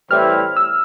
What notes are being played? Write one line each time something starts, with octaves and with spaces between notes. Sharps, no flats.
A2 E3 G3 C4 E4 F6
E6